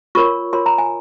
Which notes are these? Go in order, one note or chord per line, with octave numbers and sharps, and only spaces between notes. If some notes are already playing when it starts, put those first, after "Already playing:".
F4 A#4 C#5 C#6
F4 A#4 C#5 C6
A#5
G#5